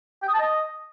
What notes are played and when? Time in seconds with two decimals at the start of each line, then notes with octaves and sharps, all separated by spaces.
0.23 G5
0.28 D#6
0.34 A5
0.39 D#5